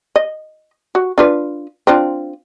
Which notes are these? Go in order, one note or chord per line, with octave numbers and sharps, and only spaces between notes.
D#5
F#4
D4 F4 B4
C4 D4 F4